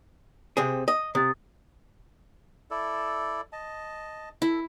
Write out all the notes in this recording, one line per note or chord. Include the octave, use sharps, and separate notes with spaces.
C3 C4 G#4
D#5
C3 D#6 A6
E4 A4 D5
D#5 A5
E4 A4